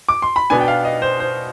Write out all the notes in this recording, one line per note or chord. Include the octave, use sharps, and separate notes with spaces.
D6
C6
B5
B2 B3 D4 G#5
G5
F5
D#5
C5
C5